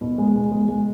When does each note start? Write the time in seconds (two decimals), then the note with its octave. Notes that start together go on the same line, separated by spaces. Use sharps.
0.01 B2
0.18 G#3
0.35 B2
0.52 G#3
0.69 G#3